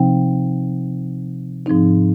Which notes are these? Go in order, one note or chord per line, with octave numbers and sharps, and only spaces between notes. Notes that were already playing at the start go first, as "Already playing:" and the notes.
Already playing: C3 F3 C4 D#4 G5
G#2 F3 C4 D#4